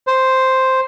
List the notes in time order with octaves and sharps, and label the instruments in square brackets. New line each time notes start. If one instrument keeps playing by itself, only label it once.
[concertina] C5